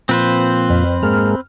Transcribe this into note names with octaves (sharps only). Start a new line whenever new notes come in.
A#2 F3 C4 B4 C5
F2
G#2 G#3 A#3 F6